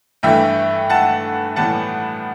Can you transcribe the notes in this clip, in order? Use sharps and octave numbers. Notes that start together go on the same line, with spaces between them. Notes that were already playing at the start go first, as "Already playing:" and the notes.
G2 E3 A3 E5 G5
F#5 A5
A2 E3 G3 B3 F#5 A5